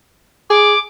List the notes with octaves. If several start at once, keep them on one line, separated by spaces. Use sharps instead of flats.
G#4 D6